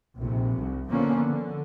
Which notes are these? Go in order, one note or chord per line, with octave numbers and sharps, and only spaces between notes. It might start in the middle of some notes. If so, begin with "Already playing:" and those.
F1 A#1 C3
C2
D3 F3 A#3 B3 C#4
D3